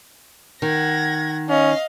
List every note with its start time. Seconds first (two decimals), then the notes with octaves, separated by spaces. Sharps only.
0.62 D#3 F#5 G#6 A#6
1.48 C#4 D#5 F5